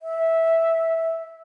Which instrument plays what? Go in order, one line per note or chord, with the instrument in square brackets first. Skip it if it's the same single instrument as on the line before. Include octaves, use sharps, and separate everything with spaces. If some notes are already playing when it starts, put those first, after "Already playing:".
[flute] E5